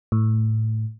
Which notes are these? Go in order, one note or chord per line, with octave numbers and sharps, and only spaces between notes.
A2